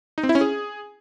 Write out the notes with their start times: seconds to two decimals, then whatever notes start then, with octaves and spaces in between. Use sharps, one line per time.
0.18 D#4
0.23 C4
0.29 E4
0.35 C#4
0.41 G#4